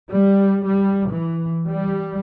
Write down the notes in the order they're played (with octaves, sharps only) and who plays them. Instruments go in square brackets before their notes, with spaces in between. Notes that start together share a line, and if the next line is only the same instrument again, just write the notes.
[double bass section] G3
G3
E3
G3